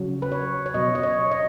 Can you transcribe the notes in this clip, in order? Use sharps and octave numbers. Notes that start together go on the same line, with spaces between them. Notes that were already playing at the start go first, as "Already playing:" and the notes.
Already playing: C#3 F#3
B4
C#5
C#5
B2 F#3 D#5
D#5
C#5
D#5